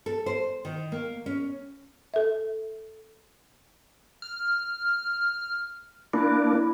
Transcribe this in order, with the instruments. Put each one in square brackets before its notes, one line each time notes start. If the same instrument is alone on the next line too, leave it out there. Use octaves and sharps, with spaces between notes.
[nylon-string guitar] A4
C5
D#3
A#3
C#4
[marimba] A4 E5
[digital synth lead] F6
[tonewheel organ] A#3 D4 [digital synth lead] E4